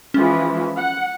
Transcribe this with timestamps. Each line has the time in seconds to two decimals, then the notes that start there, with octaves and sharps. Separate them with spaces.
0.14 E3 F3 G#3 C#4
0.77 F#5